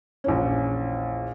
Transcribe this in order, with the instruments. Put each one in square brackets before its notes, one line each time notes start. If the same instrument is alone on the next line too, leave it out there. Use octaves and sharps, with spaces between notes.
[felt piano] A#1 E2 C#4